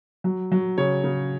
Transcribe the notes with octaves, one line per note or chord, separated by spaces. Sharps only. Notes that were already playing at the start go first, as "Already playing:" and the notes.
F#3
F#3
C#3 C#5
C#3